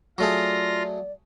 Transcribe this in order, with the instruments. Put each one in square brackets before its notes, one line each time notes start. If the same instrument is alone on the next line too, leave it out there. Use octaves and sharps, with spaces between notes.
[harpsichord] F#3 A3 G#4 [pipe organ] F4 A#6 [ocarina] D5